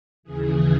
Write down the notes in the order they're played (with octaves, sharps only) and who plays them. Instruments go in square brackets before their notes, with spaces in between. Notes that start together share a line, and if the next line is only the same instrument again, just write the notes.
[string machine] D#2 C#3 E3 G#4